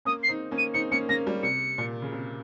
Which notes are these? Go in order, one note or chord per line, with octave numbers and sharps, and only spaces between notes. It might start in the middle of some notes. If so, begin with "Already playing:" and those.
A#3 C#4 D#6
C7
C4 D#4
A#3 C#4
D#7
C4 D#4 C#7
A#3 C#4 C#7
A#3 C#4 A#6
G3 A#3
C3 C#7
A#2
C#3
C3